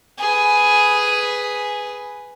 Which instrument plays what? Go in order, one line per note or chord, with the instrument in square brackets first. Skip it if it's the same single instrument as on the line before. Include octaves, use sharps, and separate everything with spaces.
[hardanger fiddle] G#4 B4